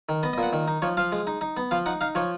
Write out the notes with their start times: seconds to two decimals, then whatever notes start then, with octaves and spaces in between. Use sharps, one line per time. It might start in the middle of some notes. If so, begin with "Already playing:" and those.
0.09 D#3
0.23 B3 D#5
0.33 D#5
0.38 A#2 F#5
0.53 D#3
0.68 D#4
0.82 F3 C#5
0.97 F3 F5
1.12 G#3
1.27 D#4
1.41 D#4
1.57 B3
1.71 F3 F5
1.86 D#4 F#5
2.01 D#4 F5
2.15 F3 C#5